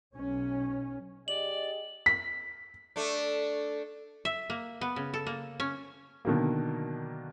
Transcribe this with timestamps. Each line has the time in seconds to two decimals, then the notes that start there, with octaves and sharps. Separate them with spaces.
0.15 B1 C#4
1.28 G4 G#4 D5 D#5 F#7
2.06 B6
2.96 A3 D4
4.25 E5
4.50 A#3
4.81 B3
4.96 C#3
5.14 A4
5.27 A#3
5.60 C#4
6.25 B2 D3 D#3 F#3 A#3